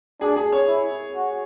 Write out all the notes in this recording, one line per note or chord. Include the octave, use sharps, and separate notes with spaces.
D4 G#4
G#4
C#5
E4
F#4